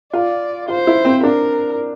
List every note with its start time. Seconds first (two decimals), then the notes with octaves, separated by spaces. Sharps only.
0.13 F4 D5
0.68 F4 C5
0.87 E4
1.05 C4
1.23 D4 A#4